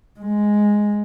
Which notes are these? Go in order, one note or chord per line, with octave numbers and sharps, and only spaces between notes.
G#3